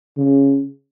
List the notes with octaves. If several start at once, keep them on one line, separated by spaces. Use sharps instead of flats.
C#3